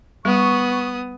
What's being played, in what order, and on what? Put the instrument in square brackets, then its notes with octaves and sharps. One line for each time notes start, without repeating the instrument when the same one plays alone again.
[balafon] G3 [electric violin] B3 D#6 [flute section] C#6